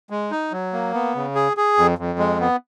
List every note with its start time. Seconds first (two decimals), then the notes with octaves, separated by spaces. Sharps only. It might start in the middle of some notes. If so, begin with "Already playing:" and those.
0.10 G#3
0.31 D#4
0.52 F#3
0.73 A#3
0.94 B3
1.15 C#3
1.35 G#4
1.57 G#4
1.78 F2
1.98 F2
2.19 G#3
2.40 B3